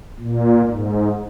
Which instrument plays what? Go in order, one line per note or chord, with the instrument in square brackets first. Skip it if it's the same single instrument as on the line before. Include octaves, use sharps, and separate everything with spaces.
[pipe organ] A#2
G#2